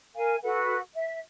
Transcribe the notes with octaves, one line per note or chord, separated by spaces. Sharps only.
A#4 F5 G#5
F#4 A4 B4 F#5
E5